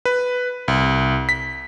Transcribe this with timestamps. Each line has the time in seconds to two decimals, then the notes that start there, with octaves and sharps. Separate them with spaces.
0.05 B4
0.68 C2
1.29 B6